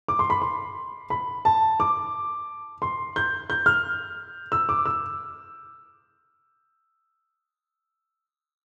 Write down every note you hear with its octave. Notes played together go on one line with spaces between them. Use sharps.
D6
C6
B5
C6
B5
A5
D6
C6
G6
G6
F6
E6
D6
E6